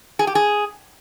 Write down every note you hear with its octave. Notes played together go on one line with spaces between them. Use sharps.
G#4
G4
G#4